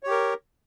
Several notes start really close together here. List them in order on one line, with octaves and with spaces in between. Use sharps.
C#5 G4 A#4